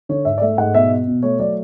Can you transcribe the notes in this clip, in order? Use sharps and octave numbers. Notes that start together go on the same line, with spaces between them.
D3 C#5
G#2 E5
D5
A3 E5
G#2 F#5
B2 E5
B3
B2
A3 C#5
F#3 D5